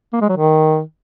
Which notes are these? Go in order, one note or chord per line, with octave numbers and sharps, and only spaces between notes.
A#3
G#3
F#3
D#3